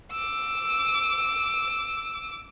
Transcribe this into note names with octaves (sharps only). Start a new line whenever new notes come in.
D6 E6